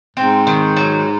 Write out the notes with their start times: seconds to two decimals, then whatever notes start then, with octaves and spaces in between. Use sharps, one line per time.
0.17 G#2 C4
0.47 D#3
0.77 F#3